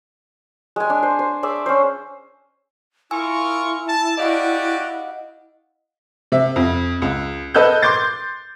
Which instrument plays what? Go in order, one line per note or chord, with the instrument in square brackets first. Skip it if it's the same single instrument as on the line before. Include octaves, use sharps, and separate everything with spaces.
[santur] G#3 G#5
D4
C5
C5
G#4 D5 E5
C#4 C5
[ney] E4 [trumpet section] F4 A#4 C#6 [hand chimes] G#5 E6
[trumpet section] A5
[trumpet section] F#4 G4 D5 [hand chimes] D#5 F5 F#5
[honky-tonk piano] C3 E5
F2
C#2
A4 B4 D#5 E6 F#6 G6
C6 D6 G6 A6